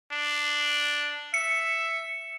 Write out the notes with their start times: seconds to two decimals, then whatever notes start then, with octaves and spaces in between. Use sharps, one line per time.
0.12 D4
1.34 E5 C#7